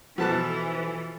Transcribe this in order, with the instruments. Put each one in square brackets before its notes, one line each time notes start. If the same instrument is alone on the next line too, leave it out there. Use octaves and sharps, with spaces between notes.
[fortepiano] B2 A5 F#6 [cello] E3 [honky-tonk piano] F3 A4 B6